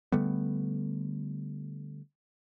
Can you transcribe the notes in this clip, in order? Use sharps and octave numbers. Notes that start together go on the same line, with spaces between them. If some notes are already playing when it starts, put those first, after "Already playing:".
D3 G3 A3 B3